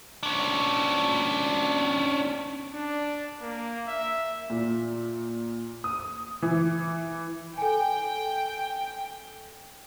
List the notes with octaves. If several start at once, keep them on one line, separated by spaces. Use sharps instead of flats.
C#4 D4
D4
A#3
E5
A#2
D#6
E3
A4 G5 G#5